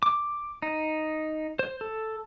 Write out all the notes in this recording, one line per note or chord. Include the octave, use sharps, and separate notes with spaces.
D6
D#4
C5
A4